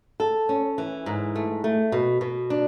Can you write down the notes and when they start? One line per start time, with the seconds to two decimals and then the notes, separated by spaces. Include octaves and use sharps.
0.20 A4
0.49 C#4
0.78 E3
1.06 G#2
1.35 A3
1.64 A3
1.92 B2
2.21 B2
2.50 D4